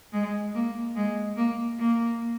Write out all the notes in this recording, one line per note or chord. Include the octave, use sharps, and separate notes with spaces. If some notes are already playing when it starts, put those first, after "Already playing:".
G#3
A#3
G#3
A#3
A#3